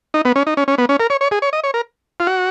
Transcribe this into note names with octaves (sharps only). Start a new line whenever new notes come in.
D#4
B3
C#4
D#4
C#4
C#4
B3
C#4
A#4
C#5
C#5
G#4
C#5
D#5
C#5
A#4
F4
F#4